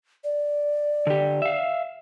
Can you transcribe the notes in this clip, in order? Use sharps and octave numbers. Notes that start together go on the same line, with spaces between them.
D5
D3 G4
E5 F5